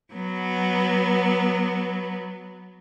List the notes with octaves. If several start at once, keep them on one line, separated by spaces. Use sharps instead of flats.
F#3 B3